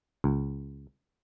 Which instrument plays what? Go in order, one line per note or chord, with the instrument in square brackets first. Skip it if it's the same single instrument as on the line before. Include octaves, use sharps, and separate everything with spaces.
[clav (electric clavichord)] C#2